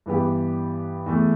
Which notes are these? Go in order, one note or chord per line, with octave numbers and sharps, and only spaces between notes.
G2 E3 B3 G4
E2 E3 A3